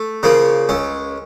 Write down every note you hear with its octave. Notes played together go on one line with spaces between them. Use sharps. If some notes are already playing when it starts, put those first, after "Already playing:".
Already playing: A3
C#3 F3 A#3
C#2 C#4